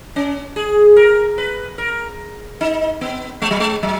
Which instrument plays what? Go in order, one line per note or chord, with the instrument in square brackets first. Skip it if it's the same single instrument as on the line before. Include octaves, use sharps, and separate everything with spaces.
[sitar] C#4
G#4
A#4
B4
A#4
D#4
B3
G#3
F#3
G#3
F#3